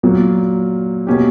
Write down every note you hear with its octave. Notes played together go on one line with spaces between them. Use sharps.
A#2 F#3 A#3
B2 A#3 C#4 G4